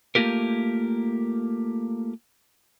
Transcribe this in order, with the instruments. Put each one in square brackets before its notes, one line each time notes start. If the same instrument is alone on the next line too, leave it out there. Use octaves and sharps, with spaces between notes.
[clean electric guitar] A3 A#3 C#4 F4 G4 A#4